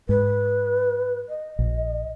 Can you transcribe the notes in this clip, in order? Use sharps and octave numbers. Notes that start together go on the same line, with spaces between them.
G#2 B4
D#5
A#1